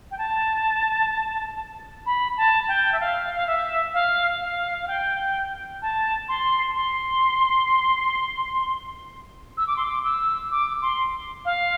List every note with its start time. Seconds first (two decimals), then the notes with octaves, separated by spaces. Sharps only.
0.11 G5
0.18 A5
2.06 B5
2.37 A5
2.68 G5
2.93 E5
3.00 F5
3.35 F5
3.47 E5
3.94 F5
4.41 F5
4.82 F5
4.88 G5
5.82 A5
6.29 C6
6.76 C6
9.57 E6
9.67 D6
9.77 C6
9.86 D6
10.04 E6
10.51 D6
10.82 C6
11.45 F5